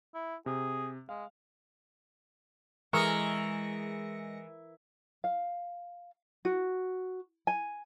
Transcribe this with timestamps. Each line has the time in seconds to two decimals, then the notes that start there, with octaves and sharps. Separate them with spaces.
0.14 E4
0.46 C3 G#4
1.09 G#3 F5
2.93 E3 G#3 A#4 C#6 E6 A#6 C#7
5.24 F5
6.45 F#4
7.47 G#5